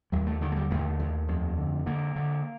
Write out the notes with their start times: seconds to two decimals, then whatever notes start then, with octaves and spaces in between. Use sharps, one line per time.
0.12 D#2 G3
0.27 A3
0.41 D3 D#3
0.52 A3
0.56 G3
0.70 D#2 A3
1.00 D#2
1.28 F2
1.57 D3
1.86 D3 A#3
2.16 D3